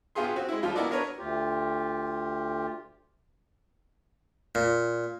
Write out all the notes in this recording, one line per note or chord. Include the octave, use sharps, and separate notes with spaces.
A#1 B3 F4 G4 G#4 C6
C4 F#4
G#3 E4
D#2 F3 G3 F4
B3 E4 F#4 A#4 D5 D#5
B3 D4 A#4 B4 C#5
D2 F4 G4
A#2